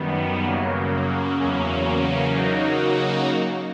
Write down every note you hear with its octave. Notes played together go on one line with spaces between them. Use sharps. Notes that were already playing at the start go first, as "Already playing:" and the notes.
Already playing: F#2 D#3 G3 B3
F#2 C#3 F#3 A#3
E2 C#3 F#3 A#3 C#4
C#3 F#3 A#3 D#4 F#4